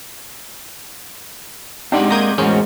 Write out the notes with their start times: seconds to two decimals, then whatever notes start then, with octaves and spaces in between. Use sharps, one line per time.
1.92 G#3 C4 D4 D#4 G4 D5 F#5
2.11 A#3 A#5 D#6 G6 G#6
2.38 E2 A2 G#3 C#4 F#4 G#4 A#4 C5